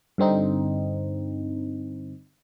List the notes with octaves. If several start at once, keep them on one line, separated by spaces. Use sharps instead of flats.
G2 D3 C4 D#4